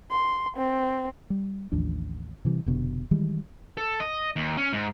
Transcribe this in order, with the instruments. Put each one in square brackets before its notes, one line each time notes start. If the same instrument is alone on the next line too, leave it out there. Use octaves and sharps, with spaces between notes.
[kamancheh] C6
C4
[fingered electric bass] G3
A1 D#2 F3 D4
C3 E3 G3
F1 B2 D3
D#3 E3 G3 G#3
[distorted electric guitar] A4
D#5
D#2
C#4
G#2